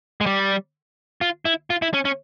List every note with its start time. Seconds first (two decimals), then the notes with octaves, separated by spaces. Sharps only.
0.21 G#3
0.26 G3
1.21 F4
1.45 E4
1.70 F4
1.82 E4
1.94 C#4
2.05 C#4